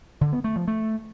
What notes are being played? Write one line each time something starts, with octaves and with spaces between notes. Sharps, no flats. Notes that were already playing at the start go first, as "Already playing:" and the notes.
D3
B3
A3
F3
A3